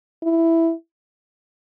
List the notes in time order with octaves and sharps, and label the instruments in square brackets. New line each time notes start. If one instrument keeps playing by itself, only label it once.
[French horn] E4